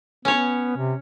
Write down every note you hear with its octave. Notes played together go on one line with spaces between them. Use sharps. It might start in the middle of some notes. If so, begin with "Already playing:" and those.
B3 C#4 C#5
C3